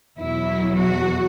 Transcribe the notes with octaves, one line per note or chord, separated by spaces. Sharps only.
E2 B2 F#3 E4
F#4